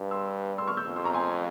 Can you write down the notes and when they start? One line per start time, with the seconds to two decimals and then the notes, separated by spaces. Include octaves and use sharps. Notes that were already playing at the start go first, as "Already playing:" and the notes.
Already playing: G2
0.11 C6 E6
0.58 C6 E6
0.67 C#6 F6
0.77 E6 G6
0.87 F2
0.96 C6 E6
1.05 A#5 C#6
1.14 G#5 C6